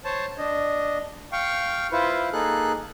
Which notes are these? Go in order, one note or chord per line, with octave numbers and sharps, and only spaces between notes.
C5 C#5 A5
D4 D#5
F5 G5 C#6
E4 F4 B4 C5
A#3 D#4 G#4 A4 F#6